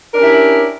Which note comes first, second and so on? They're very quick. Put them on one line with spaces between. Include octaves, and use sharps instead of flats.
A#4 D4 C#4 G4 E4